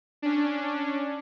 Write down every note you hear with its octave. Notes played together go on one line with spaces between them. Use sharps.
C#4 D4